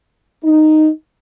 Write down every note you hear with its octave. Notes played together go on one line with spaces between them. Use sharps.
D#4